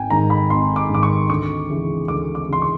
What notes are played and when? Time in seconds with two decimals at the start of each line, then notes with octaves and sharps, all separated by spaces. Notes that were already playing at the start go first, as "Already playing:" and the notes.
Already playing: G#1 G5 G#5
0.10 G#2 D#3 A#5
0.30 B5
0.50 G#1 C6
0.76 D6
0.90 G#2 D#3 D6
1.03 C#6
1.30 D2 C#6
1.70 C#3 E3
2.08 D2 D6
2.35 D6
2.48 C#3 E3 C6
2.62 C#6